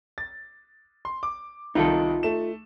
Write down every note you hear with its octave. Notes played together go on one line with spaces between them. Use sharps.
A6
C6
D6
C2 D#3 D#4 F4 A4
A3 E7